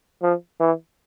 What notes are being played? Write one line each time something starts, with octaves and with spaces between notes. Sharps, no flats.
F3
E3